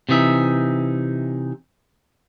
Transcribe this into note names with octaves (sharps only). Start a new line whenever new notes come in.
C3 E3 D#4 E5